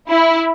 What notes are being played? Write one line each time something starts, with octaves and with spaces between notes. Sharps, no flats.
E4